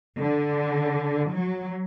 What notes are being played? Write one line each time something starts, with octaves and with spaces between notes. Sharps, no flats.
D3
F#3